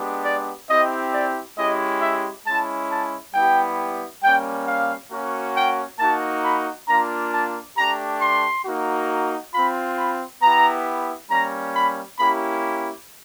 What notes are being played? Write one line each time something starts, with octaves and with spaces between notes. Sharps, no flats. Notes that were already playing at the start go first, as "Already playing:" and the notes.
Already playing: G#3 B3 D4 G4
D5
C4 E4 G4 D#5
D5
G#3 C#4 E4 G4 D#5
E5
G#3 C#4 E4 A5
A5
G3 B3 E4 G4 G5
G3 A#3 C#4 G5
F5
A#3 C#4 F#4
G5
A#3 D#4 F#4 A5
B5
A#3 D4 F4 A#5
A5
A3 D4 G4 A#5
C6
A#3 D#4 F#4
C4 F4 B5
B5
B3 E4 G4 A#5
G3 A#3 C#4 A#5
B5
A#3 C#4 E4 G4 B5